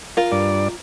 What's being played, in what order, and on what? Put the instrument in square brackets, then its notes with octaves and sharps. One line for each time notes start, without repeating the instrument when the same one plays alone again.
[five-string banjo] F4 A#4
[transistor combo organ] G2 D5